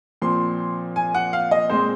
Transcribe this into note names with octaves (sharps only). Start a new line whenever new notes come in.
A#2 F3 C4 C6
G#5
F#5
F5
D#5
A#2 G#3 C4 C5